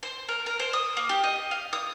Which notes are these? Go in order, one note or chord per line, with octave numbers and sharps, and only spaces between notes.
C5
A#4
A#4
C5
D#6
A#3
G4
D#5
F5
D#6